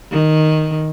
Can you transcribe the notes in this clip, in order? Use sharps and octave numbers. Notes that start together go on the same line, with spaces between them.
D#3